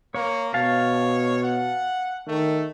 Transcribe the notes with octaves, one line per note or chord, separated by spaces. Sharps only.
A#3 C#5
B2 C#5 F5 A5
F#5
D#3 A3